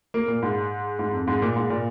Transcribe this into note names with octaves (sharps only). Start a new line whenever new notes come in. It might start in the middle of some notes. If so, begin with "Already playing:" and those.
A#3
A#2
G#2
G#2
F2
G#2
A#2
G#2
A#2